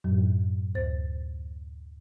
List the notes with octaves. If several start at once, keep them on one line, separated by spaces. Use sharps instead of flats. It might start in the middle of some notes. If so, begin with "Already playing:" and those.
F#2 A2 F#3
D2 C5 A6